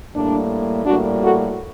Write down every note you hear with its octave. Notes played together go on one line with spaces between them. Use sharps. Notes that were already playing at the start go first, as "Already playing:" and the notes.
A2 G3 A#3 D4
A2 G3 A#3 D4 F#4
F#4 A4